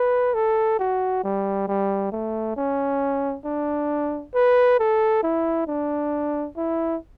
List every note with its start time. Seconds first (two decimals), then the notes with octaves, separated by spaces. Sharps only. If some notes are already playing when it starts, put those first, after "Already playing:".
Already playing: B4
0.34 A4
0.79 F#4
1.24 G3
1.68 G3
2.12 A3
2.56 C#4
3.45 D4
4.34 B4
4.79 A4
5.23 E4
5.67 D4
6.56 E4